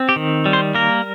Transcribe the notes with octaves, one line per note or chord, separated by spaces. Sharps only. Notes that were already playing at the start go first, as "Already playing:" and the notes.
Already playing: C4
G4
D#3
G3
C5
A#3 A#4